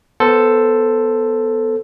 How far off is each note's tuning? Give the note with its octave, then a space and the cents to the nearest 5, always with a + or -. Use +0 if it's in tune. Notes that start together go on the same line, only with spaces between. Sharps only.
B3 +0 A4 +5 C5 -5